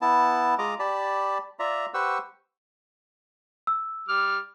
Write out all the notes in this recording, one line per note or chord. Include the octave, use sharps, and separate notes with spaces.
B3 E4 A5
G#3 F4 D#5 A#5 D6
G4 D5 A5 B5
F4 D5 E5 A#5
G4 B4 C5 F#5 C#6 E6
E6
G3 D6 F6